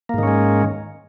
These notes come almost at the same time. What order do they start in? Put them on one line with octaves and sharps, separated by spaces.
A#3 G#2 D#3 C#4 G#3